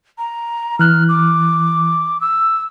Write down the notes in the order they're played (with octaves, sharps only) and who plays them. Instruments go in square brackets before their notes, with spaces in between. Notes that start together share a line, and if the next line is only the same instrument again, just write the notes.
[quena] A#5
[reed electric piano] E3 F#6 [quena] F6
[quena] D6
E6